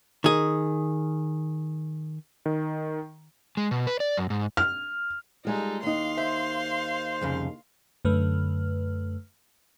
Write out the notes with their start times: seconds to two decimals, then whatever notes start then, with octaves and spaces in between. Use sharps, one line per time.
0.24 D#3 G#4
2.46 D#3
3.57 G#3
3.71 B2
3.87 B4
4.00 D5
4.17 F#2
4.30 G#2
4.57 F6
5.45 G3 G#3 D#4 F4 A4
5.83 D#2 D#4 F5 C6
6.18 C5 E5
7.21 C2 F2 C#3
8.05 F#2 D3 A3 B4 F6